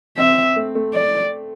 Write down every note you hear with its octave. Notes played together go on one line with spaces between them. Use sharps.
C4 E5
A3
A3
D5